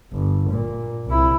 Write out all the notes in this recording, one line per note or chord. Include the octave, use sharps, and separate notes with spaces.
G1
A#2
C2 E4